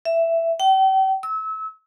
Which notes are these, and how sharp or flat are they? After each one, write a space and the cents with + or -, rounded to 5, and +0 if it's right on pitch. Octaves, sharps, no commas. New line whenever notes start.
E5 +10
G5 -40
E6 -30